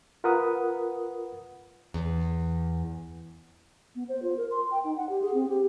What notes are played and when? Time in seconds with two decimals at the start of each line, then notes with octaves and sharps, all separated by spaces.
0.24 F4 A#4 B4 F#5 B5 D#6
1.94 E2
3.96 B3
4.09 C5
4.23 F4
4.37 A#4
4.51 C6
4.71 G5
4.84 D#4
4.97 F#5
5.09 G4
5.22 G#4
5.34 C4
5.48 G4